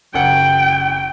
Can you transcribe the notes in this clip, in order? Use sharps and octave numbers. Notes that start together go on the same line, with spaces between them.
F#1 F#5 G5